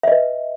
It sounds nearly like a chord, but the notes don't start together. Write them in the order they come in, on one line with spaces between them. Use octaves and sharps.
E5 D#5 B4